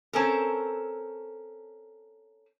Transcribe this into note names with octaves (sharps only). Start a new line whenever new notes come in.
C4 C#4 A4 A#4